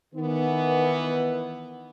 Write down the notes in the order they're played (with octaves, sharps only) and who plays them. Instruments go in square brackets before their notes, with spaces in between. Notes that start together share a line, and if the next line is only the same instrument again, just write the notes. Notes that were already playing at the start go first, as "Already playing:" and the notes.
[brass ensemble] D#3 E3 B3